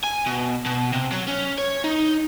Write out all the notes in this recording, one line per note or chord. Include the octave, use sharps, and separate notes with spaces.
G#5
B2
B2
C3
F#3
C#4
C#5
D#4